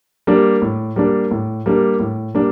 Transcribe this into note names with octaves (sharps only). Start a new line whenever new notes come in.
G3 A#3 D4
A2
G3 A#3 D4
A2
G3 A#3 D4
A2
G3 A#3 D4